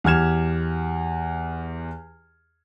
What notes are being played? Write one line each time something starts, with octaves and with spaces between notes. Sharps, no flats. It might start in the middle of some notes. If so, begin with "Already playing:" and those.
E2 G4 F6 G#6 E7